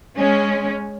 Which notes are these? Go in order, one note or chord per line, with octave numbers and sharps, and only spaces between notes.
G#3 C#4